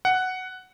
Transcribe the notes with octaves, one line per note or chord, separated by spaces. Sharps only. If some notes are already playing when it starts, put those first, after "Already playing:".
F#5